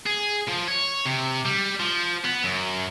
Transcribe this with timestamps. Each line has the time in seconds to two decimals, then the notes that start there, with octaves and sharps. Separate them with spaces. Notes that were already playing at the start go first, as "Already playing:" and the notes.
0.06 G#4
0.48 F3
0.68 C#5
1.05 C3
1.46 G3
1.80 F3
2.25 B3
2.44 F#2